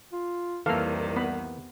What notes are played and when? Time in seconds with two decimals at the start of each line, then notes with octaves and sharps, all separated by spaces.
0.12 F4
0.66 C2 F2 C3 D#3 E3 A#3 A4 F5
1.17 B3 B5